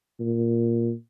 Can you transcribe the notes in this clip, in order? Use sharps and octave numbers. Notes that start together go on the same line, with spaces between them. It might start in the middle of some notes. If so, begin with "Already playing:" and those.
A#2